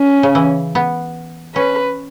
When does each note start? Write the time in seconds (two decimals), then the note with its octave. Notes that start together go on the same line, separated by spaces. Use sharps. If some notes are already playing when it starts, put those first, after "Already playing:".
Already playing: C#4
0.23 C#3
0.35 E3
0.75 B3
1.55 C#4 B4